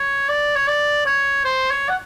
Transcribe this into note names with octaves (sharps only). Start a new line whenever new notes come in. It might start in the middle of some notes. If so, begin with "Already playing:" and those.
Already playing: C#5
D5
C#5
D5
C#5
C5
C#5
F#5